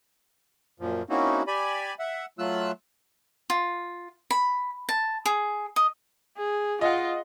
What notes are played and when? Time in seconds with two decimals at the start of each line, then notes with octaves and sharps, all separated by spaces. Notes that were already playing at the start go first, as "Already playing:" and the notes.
0.80 F#2 A#2 F3
1.10 A#3 C4 C#4 D#4 E4 F#4
1.47 G4 D5 G#5 B5
1.99 E5 F#5
2.39 F#3 A3 F4 E6 F#6
3.50 F4
4.31 B5
4.89 A5
5.26 G#4
5.76 D#5
6.37 G#4
6.81 F4 D#5 F#5